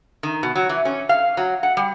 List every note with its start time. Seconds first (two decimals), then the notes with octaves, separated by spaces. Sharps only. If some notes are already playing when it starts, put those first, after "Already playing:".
0.23 D#3
0.43 B2
0.56 F#3
0.69 E3
0.85 C#4
1.09 F5
1.37 F#3
1.63 F#5
1.77 G3